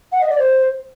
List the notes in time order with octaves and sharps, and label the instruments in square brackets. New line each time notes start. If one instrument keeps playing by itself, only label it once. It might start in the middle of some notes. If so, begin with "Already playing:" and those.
[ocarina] F#5
D#5
D5
C5